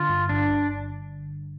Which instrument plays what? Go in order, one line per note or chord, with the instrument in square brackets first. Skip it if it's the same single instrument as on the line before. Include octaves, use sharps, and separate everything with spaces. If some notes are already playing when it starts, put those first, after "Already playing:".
Already playing: [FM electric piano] D3 [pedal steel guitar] F4
[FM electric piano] G2
[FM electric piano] G1 [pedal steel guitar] D4
[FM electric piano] G1